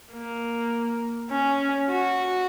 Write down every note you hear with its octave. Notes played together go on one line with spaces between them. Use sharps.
A#3
C#4
F#4